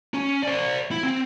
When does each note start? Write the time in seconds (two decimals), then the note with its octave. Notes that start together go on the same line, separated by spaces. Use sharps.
0.14 C#4
0.43 C5 D5
0.91 E4
1.03 C4